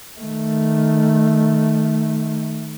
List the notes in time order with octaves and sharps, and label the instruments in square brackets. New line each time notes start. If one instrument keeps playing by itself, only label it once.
[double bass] D#3 A3